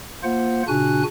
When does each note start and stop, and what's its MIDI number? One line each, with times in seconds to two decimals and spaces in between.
0.23 0.63 58
0.23 0.63 65
0.23 0.63 72
0.23 0.63 78
0.68 1.03 46
0.68 1.03 49
0.68 1.03 62
0.68 1.03 66
0.68 1.03 80
0.68 1.03 90